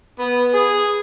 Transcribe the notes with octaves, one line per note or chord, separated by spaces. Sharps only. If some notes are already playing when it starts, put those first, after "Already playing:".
B3
G#4